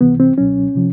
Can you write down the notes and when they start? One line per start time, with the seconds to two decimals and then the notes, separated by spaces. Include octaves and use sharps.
0.01 C#2 C3 E3 B3
0.20 C4
0.37 C#2 B2 F#3 C#4
0.76 C3 F3